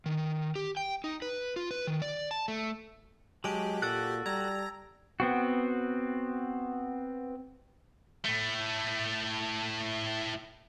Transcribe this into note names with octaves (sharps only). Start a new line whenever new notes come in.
D#3
G4
G5
D#4
B4
F4
B4
D#3
D5
A5
A3
F#3 G#3 G4 A5 D7
A#2 F#4 A4 E6 F#6 A6 D7
G3 A#5 E6 G#6
B3 C4 F#4
A2 A3